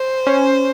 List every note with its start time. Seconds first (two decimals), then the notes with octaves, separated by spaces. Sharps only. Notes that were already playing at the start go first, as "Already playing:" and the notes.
Already playing: C5
0.27 C#4